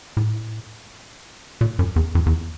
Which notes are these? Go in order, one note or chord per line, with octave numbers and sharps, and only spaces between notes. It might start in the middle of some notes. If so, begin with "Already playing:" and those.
A2
A#2
F#2
E2
F2
E2